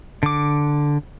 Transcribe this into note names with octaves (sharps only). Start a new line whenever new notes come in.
D3 D6